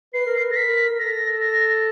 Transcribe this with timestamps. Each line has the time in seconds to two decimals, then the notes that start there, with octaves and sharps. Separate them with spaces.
0.14 B4 C7
0.26 A#4
0.38 B4
0.50 A4 A#6
0.56 A#4 B6
0.91 A#4
0.99 A4 A#6
1.41 A#6